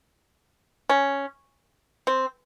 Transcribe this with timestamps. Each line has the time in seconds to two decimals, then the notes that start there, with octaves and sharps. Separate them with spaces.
0.89 C#4
2.07 C4